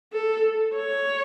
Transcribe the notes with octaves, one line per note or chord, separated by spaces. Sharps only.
A4
C#5